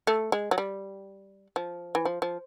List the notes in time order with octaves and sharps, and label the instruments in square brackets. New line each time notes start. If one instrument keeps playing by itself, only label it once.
[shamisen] A3
G#3
F#3
G3
F3
E3
F3
F3